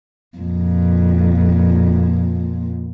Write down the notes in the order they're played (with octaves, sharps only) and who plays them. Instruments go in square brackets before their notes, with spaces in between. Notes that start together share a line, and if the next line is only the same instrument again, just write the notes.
[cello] F2 A#2